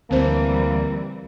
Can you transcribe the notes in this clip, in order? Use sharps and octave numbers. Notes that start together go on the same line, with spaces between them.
D2 E3 G3 A#3 C4 C5